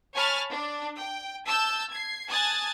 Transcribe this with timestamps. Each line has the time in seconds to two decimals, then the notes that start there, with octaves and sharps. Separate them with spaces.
0.14 C#5 G#5 A5 B5 F6 A6
0.51 D4
1.00 G5
1.46 A5 E6 G6
1.89 G#6 C7
2.28 G#5 A5 D#6 F#6 G#6 A6